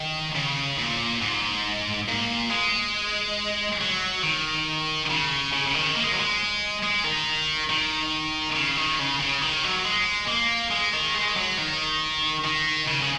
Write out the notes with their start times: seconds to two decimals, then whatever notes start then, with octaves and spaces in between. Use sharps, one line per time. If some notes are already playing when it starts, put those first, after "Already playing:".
Already playing: D#3
0.36 C#3
0.79 A#2
1.22 G#2
2.09 A#2
2.51 G#3
3.80 F#3
4.23 D#3
5.10 C#3
5.53 C#3
5.67 C#3
5.75 D#3
5.96 A#3
6.04 G#3
6.12 F#3
6.20 G#3
6.83 G#3
7.04 D#3
7.70 D#3
8.55 C#3
8.77 D#3
8.99 C#3
9.20 C#3
9.42 D#3
9.64 F#3
9.84 G#3
10.28 A#3
10.71 G#3
10.93 D#3
11.15 G#3
11.37 F#3
11.58 D#3
12.44 D#3
12.88 C#3
13.02 C#3